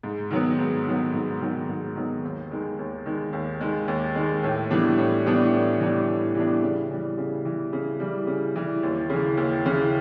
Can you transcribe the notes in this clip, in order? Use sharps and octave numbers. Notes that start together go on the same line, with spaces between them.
G#2
D#3 F#3 B3
G#2
D#3 F#3 B3
G#2
D#3 F#3 B3
G#2
D#3 F#3 B3
D#2
D#3 G#3
D#2
D#3 G#3
D#2
D#3 G#3
D#2
D#3 G#3
A2
E3 G3 B3 D4
A2
E3 G3 B3 D4
A2
E3 G3 B3 D4
A2
E3 G3 B3 D4
C#3
E3 G3
C#3
E3 G3
C#3
E3 G3
C#3
E3 G3
D#2
C#3 E3
D#2
C#3 E3